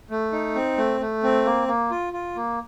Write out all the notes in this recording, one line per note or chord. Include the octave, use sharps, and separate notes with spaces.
A3
D#4
C4
A3
A3
C4
A#3
A#3
F4
F4
A#3